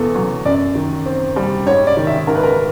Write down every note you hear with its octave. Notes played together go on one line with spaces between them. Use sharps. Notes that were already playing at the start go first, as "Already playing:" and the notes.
Already playing: E2 B2 A4
F#3
F#2 D5
D#3
C4
G3
G#2 C#5
D5
D#3
E5
G#2 A#4
B4
A#4